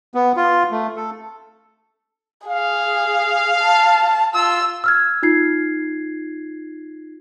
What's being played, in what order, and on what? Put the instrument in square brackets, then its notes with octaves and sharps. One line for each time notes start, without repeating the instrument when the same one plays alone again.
[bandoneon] B3
F4
A3
A4
[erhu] G#4 [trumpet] F5
[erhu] A5
[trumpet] F4 [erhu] E6
[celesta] E6 F6 G#6
D#4 F4 G#6 C7